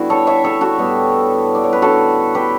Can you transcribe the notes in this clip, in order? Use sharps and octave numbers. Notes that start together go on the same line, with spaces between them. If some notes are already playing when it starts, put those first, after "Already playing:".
Already playing: D3 G3 A3 B3 E4 F#4
A4 C#5
C#5 E5
A4 C#5
F#4 A4
A2 G3 B3
D5
C#5
B4
D3 A3 F#4 A4
G4 B4